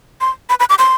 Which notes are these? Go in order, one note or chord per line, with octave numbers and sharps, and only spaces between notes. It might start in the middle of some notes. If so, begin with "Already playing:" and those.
C6
B5
B5
D6
C6